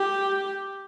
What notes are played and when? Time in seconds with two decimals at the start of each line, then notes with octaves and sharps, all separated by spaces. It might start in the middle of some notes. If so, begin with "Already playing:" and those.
Already playing: G4